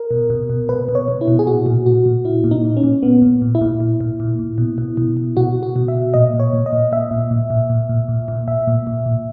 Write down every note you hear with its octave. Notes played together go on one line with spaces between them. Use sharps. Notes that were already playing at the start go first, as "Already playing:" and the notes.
Already playing: A#4
B2
B2
B2
B2 B4
B2
C#5
B2
E4
B2
G#4
A#2 F#4
A#2
A#2 F#4
A#2
A#2 E4
A#2
D#4
A#2
C#4
A#2
A#2 B3
A#2
A#2
E4
A#2
A#2
A#2
A#2
A#2
B2
B2
B2
B2
B2 F#4
B2
F#4
B2
E5
B2
A#2 D#5
A#2
C#5
A#2
D#5
A#2
A#2 E5
A#2
A#2
A#2
A#2
A#2
A#2
A#2
A#2 E5
A#2
A#2
A#2